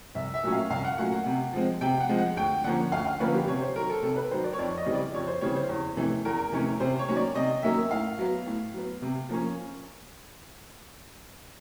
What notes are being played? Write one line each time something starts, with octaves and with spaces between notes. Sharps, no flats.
C2 E5
E5
A#2 F#3 A3 C#4
F5
C2 F5
F#5
A#2 F#3 A3 C#4 F#5
F#5
C3
F3 G#3 C4
C3 G5
F#5
F3 G#3 C4
F#5
D2 G5
D3 F3 A#3 C#4 F#5
D2 F5
F5
D3 F3 A#3 C#4 B4
G4
C3 C#5
C5
D#3 F#3 A#4
A4
C3 A4
B4
D#3 F#3 C5
D5
C#5
F2 D5
D#5
C#3 E3 G3 C4
D5
F2 C#5
C5
C#3 E3 G3 C4 C#5
C5
E2
C3 E3 A3 C#4
E2 A#4
C3 E3 A3 C#4
C3 C5
C#5
D#3 F#3 A#3 C#4
D5
C3 D#5
D#3 F#3 A#3 C#4 E5
A2 F5
F#3 B3
A2
F#3 B3
C3
F3 A#3 C#4